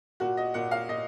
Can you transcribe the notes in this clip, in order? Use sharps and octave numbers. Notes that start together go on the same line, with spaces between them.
A#2 F#4
D#5
A#2 F#5
F5
A#2 D#5